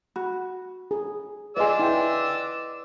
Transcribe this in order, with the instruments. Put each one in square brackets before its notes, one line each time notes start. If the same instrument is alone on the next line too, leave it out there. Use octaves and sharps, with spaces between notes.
[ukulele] F#4 [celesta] B5
[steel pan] G#4
[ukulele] F4 G#4 [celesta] B4 D#5 C6 [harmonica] D5 E6
[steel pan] E4 G5